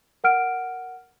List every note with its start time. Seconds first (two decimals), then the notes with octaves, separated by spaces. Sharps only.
0.24 A#4 F#5 F6 D7